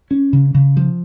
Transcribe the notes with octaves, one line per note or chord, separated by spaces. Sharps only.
C#4
C#3
C#3
F3